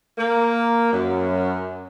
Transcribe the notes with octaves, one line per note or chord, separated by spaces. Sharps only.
A#3
F#2